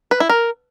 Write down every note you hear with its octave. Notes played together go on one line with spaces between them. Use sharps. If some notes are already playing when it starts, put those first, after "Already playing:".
B4
E4
A#4